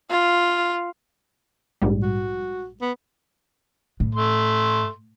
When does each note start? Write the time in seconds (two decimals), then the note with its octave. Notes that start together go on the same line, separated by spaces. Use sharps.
0.10 F4
1.82 A#1 G#2 G3
2.02 F#4
2.81 B3
4.00 A2
4.15 A3 C6